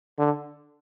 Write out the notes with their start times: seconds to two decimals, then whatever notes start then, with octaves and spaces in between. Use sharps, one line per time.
0.19 D3